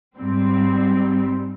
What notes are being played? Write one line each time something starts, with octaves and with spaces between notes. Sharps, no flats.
G#2 G3 C4